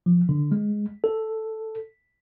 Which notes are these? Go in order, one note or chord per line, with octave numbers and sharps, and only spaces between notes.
F3
D3
G#3
A4